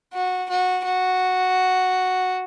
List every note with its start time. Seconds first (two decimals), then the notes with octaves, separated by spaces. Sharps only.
0.14 F#4
0.50 F#4
0.85 F#4